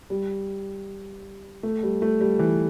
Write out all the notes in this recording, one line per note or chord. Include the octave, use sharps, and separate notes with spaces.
G3
A3
G3
A3
G3
E3